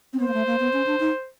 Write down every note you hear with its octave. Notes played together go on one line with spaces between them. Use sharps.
C4
B3 C5
A#3
A3
A#3
B3
C#4
D4
D#4